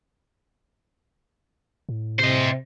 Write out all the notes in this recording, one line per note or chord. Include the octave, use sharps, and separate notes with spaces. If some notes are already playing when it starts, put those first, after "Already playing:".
A2
C3 C5 D#5